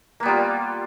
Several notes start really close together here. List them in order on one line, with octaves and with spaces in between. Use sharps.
A#3 B3 G3 F4